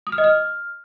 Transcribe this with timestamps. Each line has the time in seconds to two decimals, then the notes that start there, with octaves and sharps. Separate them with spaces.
0.07 D#6
0.12 F6
0.18 D#5
0.24 F6